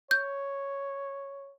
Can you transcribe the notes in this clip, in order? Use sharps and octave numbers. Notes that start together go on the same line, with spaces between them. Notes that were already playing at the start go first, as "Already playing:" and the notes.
C#5 G6